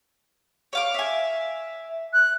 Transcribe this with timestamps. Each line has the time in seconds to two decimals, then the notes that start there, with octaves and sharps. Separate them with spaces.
0.73 C#5 F5 D6
0.94 E5 G#5
2.13 F#6